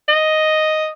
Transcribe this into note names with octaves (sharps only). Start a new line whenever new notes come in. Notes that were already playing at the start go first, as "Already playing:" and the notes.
D#5